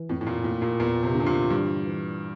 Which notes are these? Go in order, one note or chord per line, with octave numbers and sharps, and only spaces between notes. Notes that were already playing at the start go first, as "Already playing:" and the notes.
Already playing: E3
F2 A2
A2
A#2
A2 A#3
A#2
E2 A#2
C3
D3
C3
A#2
G2 E3
E3